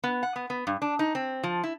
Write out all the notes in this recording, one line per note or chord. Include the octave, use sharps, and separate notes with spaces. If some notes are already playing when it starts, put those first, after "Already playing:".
B3
F#5
B3
B3
G2
D4
D#4
C4
F3
E4